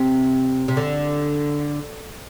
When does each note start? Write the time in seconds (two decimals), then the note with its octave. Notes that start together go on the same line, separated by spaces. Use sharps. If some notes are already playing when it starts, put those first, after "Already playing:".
Already playing: C3
0.68 C3
0.77 D3